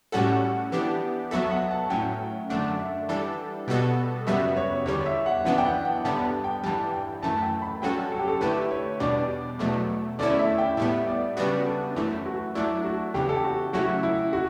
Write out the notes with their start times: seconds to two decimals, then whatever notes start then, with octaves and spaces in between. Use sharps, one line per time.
0.12 A2 G3 C#4 F#4 A4 F#5
0.72 E3 B3 D4 G4
1.31 F#3 B3 F#4 A4 E5
1.51 F#5
1.71 A5
1.90 A2 F#3 C#4 G5
2.50 F#2 D3 A3 D4 F#5
2.79 E5
3.09 E3 G3 D4 A4
3.68 B2 G3 B3 F#4 A4
4.27 F#2 C#3 G3 B3 F#4 E5
4.57 C#5
4.86 E2 D3 G3 C#5
5.06 E5
5.26 F#5
5.45 F#2 E3 B3 D4 F#5
5.58 G5
5.65 F#5
5.85 G5
6.05 G2 D3 G3 B3 A5
6.24 A5
6.44 G5
6.63 G2 E3 G3 A5
6.93 G5
7.23 F#2 E3 A3 A5
7.42 G5
7.62 B5
7.82 G2 F#3 C#4 F#4 A4 G5
8.12 A4
8.19 G4
8.28 A4
8.41 D3 A3 E4 G4 B4
8.71 C#5
9.00 E2 B2 G3 D4 D5
9.59 E2 B2 F#3 A3
10.19 E2 D3 A3 C#4 E4 D5
10.39 E5
10.58 G5
10.77 A2 G3 B3 E5
11.07 D5
11.37 C#3 G3 B3 D4 F#4 B4
11.66 A4
11.96 F#2 E3 A3
12.26 F#4
12.55 F#3 A3 D4 E4
12.84 F#4
13.14 E2 C#3 E3 G4
13.29 A4
13.36 G4
13.44 F#4
13.73 C#3 F#3 A3 C#4 E4 F#4
14.03 E4
14.33 F#4